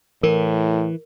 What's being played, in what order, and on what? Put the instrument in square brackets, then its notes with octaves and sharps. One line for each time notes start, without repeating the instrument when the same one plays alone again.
[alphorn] A2 [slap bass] E3 [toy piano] A#4